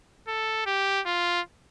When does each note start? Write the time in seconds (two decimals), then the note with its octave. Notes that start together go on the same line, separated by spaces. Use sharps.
0.28 A4
0.66 G4
1.06 F4